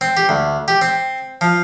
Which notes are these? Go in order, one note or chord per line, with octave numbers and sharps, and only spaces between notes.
C4
G4
D2
G4
C4
F3